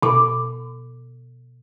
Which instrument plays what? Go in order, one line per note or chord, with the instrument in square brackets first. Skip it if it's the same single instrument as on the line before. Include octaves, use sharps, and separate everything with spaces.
[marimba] B2 D6